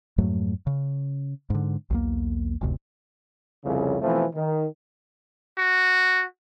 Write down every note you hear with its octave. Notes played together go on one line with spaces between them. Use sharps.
F2 G#2 F#3 A3
C#3
G#2 D3
B1 E2 A#3
F#1 D2 C3
C2 F2 C#3
B2 E3 F3 A3 C4
D#3
F#4